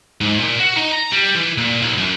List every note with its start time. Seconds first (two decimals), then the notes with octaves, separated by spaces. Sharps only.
0.21 G#2
0.39 A#2
0.59 F#4
0.77 D#4
0.92 A#5
1.12 G3
1.35 E3
1.58 A#2
1.82 B1
1.98 F#2